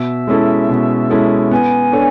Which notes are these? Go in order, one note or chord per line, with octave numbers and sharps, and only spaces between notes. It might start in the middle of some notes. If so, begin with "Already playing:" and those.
Already playing: B2 E5
G#3 C#4 E4 A4
B2
G#3 C#4 E4 A4
B3 G#5
D4 A4 C#5